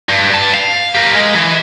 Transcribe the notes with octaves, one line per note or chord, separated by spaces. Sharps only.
G2
G2 A5
F5
G4 A#4
G#3
E3